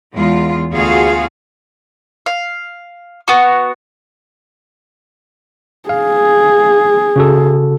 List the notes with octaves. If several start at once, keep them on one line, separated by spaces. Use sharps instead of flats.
E2 G#3 F4
D2 B3 F4 F#4 G#4 F5
F5
B3 F#4
G#4 F5
C#3 F#4 A4